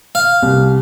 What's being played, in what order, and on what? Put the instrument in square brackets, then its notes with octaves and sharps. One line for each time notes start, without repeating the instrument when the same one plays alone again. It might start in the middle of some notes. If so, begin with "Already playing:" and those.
[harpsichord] F5
[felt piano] C2